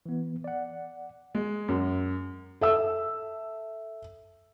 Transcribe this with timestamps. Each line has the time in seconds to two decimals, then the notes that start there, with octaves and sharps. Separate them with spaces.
0.06 E3 B3
0.44 D5 F#5
1.35 G#3
1.68 F#2
2.61 A4 E5 E6